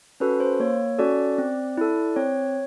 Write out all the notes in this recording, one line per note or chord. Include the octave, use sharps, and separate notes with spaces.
C#4 F#4 A4 B4
C5
A#3 C#5
C#4 F#4 A4 D5
C4
E4 A4
C4 C#5